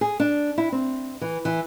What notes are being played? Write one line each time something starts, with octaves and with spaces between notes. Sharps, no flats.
G#4
D4
E4
C4
E3
E3